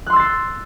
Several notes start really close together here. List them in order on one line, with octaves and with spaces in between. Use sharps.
F#6 C6 E6 A6 C7